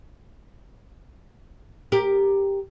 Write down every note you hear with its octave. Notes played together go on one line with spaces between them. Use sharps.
G4 A#4